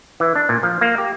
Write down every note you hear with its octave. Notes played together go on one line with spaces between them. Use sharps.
E3
D4
A#2
F3
A#3
G4